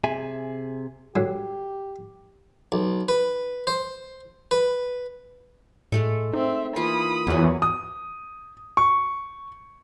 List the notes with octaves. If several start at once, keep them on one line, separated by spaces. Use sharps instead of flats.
C3 G#4 E5 G#5
A#2 D3 F#3 G4
B1
B4
C5
B4
A2 G#3 A3 A4
C4 D#4 E5
E3 A#3 F4 B5 D#6
E2 F#3 G#4
D#6
C#6